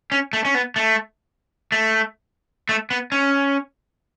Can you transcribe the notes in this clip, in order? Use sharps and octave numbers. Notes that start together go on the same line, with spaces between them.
C#4
A3
C#4
B3
A3
A3
A3
B3
C#4